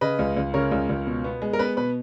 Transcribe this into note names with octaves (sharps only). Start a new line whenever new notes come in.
C#3 B4 D#5
C#2
C#2
C#3 A#4 C#5
C#2
C#2
B2
B3
G#3
A#4
B3 B4
B2 B4